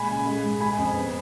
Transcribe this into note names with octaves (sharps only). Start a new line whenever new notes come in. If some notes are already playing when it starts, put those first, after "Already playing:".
Already playing: A#2 G#3 G#5 B5
C#3
G#3
G#2
G#3 G#5 B5
F2
B3